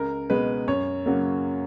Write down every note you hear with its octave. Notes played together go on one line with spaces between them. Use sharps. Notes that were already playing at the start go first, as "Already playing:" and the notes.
Already playing: C#2 A#4
B2 G#3 B4
F#2 C#5
C#3 F#3 A#3